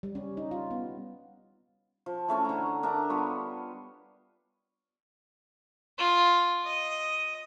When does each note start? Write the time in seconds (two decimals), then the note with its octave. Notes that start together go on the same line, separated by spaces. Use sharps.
0.03 G3
0.15 C#4
0.37 D#4
0.51 F4
0.71 B3
2.06 F3
2.28 E3 A3 C#4
2.45 D3 A#5
2.83 D4 A#4 E5 A#5
3.09 G3 B3 F4 C#5
5.99 F4
6.65 D#5